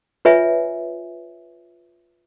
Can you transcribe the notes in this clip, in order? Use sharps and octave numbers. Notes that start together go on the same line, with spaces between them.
F4 B4 C#5 E5 G#5